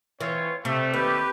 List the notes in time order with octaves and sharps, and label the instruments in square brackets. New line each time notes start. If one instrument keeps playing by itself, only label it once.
[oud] E3 [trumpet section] C4 F4 C#5
[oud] C3 [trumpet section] G3 A3
[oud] D#2 [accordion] G4 B4